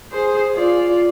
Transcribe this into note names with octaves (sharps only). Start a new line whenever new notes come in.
G#4 C5
F4 D5